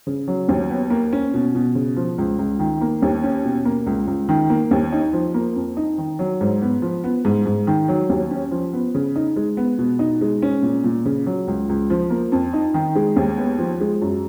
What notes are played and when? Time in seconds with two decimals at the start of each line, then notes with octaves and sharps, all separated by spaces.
0.07 C#3
0.28 F#3
0.49 D#2
0.70 B3
0.90 A#3
1.13 C#4
1.34 B2
1.55 B2
1.75 C#3
1.96 F3
2.18 C#2
2.38 C#2
2.59 D#3
2.81 A#3
3.02 D#2
3.23 C#4
3.45 B2
3.65 A#3
3.86 C#2
4.07 C#2
4.29 D#3
4.50 A#3
4.71 D#2
4.92 D#4
5.13 F3
5.34 A#3
5.56 F2
5.77 D#4
5.98 D#3
6.19 F#3
6.41 G#2
6.62 B3
6.82 F3
7.04 B3
7.25 G#2
7.46 G#2
7.67 D#3
7.88 F#3
8.10 D#2
8.31 C#4
8.51 F3
8.73 B3
8.95 C#3
9.16 D#4
9.36 G#3
9.57 B3
9.78 B2
9.99 D#4
10.21 G#3
10.42 C#4
10.63 A#2
10.84 A#2
11.05 C#3
11.26 F#3
11.47 C#2
11.69 C#2
11.90 F3
12.10 A#3
12.32 F2
12.53 D#4
12.74 D#3
12.95 G#3
13.16 D#2
13.37 B3
13.59 F3
13.80 G#3
14.02 F#2